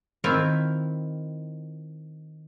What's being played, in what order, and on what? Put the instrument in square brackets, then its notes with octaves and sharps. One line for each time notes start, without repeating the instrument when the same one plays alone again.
[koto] D#3 C4 E4 F4 E5 F5